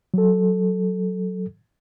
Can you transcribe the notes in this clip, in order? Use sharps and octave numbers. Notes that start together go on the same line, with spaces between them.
F#3 A4